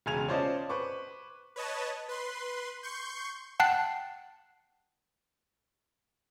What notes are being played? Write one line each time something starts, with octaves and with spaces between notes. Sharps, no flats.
E1 C#3 G#5 G#6 F7
C#4 F4 C5 D5 D#5 A5
B4 C5 C#6 D6
B4 C#5 D#5 A5
B4 C6
C6 C#6 G6
F#5 G5 A5 F#6 C7